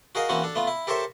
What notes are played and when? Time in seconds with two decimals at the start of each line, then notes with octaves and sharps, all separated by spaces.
0.15 F#4 G#4 A#4 D#5 F5
0.29 E3 A#3 C4 C#4 F#4
0.43 D4 A4
0.56 A3 B3 F4
0.67 E4
0.87 G4 A4 A#4 C5 C#5 E5